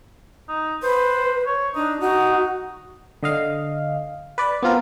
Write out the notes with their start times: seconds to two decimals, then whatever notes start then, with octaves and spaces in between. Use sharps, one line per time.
0.49 D#4
0.83 B4 C5
1.46 C#5
1.75 D4 D#4
2.01 D#4 F#4
3.23 D3 D#5 F5
4.38 B4 D5
4.63 B3 C4 F4 A#4